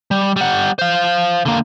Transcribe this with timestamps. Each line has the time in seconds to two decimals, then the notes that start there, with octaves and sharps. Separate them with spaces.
0.11 G3
0.36 G3 F#5
0.79 C5 F5
1.46 D3 A#3